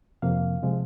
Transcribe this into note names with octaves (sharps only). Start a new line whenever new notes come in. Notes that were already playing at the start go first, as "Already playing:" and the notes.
F2 C3 F3 A#3 F5
C3 F3 G#3